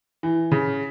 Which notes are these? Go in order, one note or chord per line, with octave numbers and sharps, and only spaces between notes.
E3
C#3